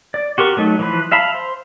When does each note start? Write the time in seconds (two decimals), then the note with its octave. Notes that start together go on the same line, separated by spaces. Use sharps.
0.14 D5
0.38 F#4 G4 A#4 C#6
0.57 F#3 A3 D#4
0.79 E3 F3 B4
1.12 E5 F5 A5 B5
1.34 C5